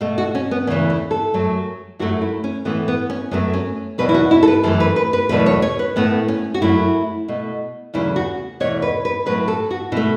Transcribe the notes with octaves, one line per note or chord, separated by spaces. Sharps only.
B2 A3
F#4
C#4
B3
E2 C#3 E3 A3 C#4
E4
A4
F#2 F#3 A3
F#2 F#3 A3 F#4
E4
C#4
A2 E3 A3 B3
B3
C#4
F#2 F#3 A3 B3
C#4
E2 B2 F#3 B4
E4
F#4
E4
A4
B4
F#2 E3 A3 A4
B4
B4
B4
E2 B2 F#3 A3 B4
C#5
C#5
B4
A2 A3 B3
C#4
F#4
F#2 F#3 A3 E4
B2 A3
E2 C#3 F#3 A3 E4
F#4
E2 B2 A3 C#5
B4
B4
A2 F#3 A3 B4
A4
F#4
B2 A3 E4